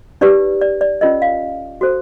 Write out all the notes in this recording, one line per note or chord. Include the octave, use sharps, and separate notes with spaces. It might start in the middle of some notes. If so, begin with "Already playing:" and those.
D#4 G4 B4 D5
D5
D5
C#4 F4 A#4 D#5
F5
F#4 A4 C5